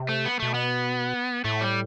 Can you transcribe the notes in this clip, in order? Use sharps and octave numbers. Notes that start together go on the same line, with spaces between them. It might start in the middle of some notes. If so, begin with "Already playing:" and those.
Already playing: C3
A3
B3
B2 A3
B3
A2 A3
G3